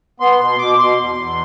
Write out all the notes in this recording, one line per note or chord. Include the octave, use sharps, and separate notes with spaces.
B3 C6
B2 C6
B2 D6
B2 C6
E2
E2